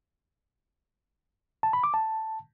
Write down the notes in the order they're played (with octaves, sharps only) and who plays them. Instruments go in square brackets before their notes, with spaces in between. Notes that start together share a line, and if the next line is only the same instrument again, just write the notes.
[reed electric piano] A5
B5
D6
A5